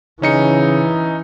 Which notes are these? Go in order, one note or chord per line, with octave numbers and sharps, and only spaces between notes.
C#3 E3 C#4 D#4 C#7